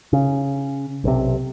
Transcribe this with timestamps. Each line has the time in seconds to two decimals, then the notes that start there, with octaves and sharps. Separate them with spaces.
0.13 C#3
1.04 B1 C3